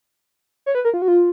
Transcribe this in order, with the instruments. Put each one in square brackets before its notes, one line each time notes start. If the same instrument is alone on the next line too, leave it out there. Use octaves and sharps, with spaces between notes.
[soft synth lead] C#5
B4
A#4
F4
F#4
F4